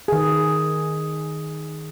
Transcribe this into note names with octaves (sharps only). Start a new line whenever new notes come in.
D#3 G#4